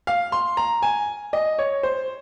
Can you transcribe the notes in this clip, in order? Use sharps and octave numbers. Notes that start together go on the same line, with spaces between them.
F5
C6
A#5
G#5
D#5
C#5
C5